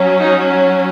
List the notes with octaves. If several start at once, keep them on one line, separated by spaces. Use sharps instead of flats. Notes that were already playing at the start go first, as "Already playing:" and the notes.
Already playing: F#3 C#4
D#4